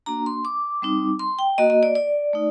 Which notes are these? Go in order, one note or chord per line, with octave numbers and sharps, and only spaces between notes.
A#3 D4 F#4 A#5
C6
D6
G3 C4 D#4
C6
G5
A#3 F#4 D#5
D#5
D5
D5
A3 D#4